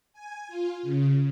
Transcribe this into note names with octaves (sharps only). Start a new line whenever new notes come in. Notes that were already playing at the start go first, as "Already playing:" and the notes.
G#5
F4
C#3